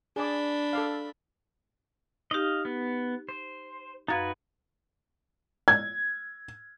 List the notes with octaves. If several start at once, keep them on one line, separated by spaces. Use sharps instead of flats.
D4 G#4 D5 B5
A4 D5 F5
D#4 G4 D#5 F5
B3
C5
F#2 D#4 F#4 B4 F5 G#6
G#6